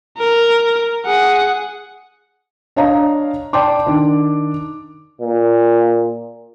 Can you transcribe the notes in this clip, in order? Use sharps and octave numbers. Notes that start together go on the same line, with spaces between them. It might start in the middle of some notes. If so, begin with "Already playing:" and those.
A#4
G#4 F#5
D4 C#5 D#5 F5 A#5
D5 G5 A5 C6 D6
D#3 D4
A#2